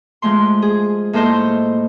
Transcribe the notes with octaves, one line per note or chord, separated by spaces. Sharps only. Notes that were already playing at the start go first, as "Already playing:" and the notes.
F3 G#3 A3 C6
G#4
A2 A#3 A4 C5 D#5 G6